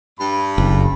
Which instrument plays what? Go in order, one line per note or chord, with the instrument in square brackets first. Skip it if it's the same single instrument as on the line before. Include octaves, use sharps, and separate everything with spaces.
[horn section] G2 B5
[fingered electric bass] F#1